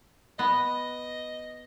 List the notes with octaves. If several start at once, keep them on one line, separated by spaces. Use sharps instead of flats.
B3 D#5